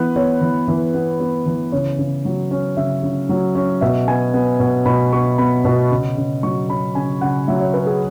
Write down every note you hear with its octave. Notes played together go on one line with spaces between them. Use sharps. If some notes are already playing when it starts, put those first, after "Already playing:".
Already playing: E3 B3 B4
B3 C#5
E3
E3
B3
B3
E3
C#3 C#5
C#3
F#3
C#4
C#3 E5
C#3
F#3
C#4
B2 E5
B3 G#5
B3
B2
B2 B5
B3 C#6
B3 B5
B2
C#3
C#3
F#3 C#6
C#4 B5
C#3 G#5
C#3 F#5
F#3 E5
C#5
C#4 B4
G#4